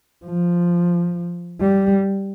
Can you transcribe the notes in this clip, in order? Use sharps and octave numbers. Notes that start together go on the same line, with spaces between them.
F3
G3